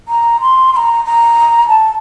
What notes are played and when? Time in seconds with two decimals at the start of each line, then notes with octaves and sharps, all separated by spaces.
0.08 A#5
0.41 C6
0.73 C6
0.77 A#5
1.05 A#5
1.68 A5